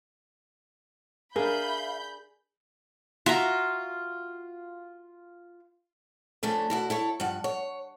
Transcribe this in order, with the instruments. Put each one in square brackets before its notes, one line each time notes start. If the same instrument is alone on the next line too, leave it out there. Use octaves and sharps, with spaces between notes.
[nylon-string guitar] D4 G#4 [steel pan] A#4 [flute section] E5 F5 [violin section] B5 G6
[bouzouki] F4 [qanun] F#4 E5 A#5
[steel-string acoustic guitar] F2 A3 C#4 D4
B2 E4 F#4
E4 A4 C#5
G2 F3 F#5
C#5